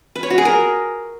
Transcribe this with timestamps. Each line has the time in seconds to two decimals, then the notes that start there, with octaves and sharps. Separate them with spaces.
0.15 B4
0.23 C#5
0.30 F#4
0.38 G#4
0.45 A#4